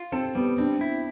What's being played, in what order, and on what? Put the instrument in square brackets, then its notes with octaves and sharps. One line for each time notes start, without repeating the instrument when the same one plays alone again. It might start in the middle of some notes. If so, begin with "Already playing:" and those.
Already playing: [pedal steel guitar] F4
[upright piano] C4 [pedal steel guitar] A4
[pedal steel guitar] G3 [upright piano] B3
[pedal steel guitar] C4 [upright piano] D4
[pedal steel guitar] E4